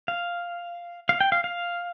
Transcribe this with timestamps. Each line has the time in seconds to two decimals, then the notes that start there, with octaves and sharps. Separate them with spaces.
0.08 F5
1.09 F5
1.21 G5
1.32 F5
1.44 F5